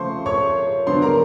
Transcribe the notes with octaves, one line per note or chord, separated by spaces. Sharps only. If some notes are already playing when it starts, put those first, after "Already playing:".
Already playing: C#3 F3 A3 C5 C6 C#6
C#5 C#6
D3 F#3 B3 D4 C5 C6
A#4 A#5